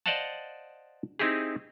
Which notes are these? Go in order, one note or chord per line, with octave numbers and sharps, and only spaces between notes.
C5 D5 D#5 F5 F#5 A5
C4 D#4 E4 G4 G#4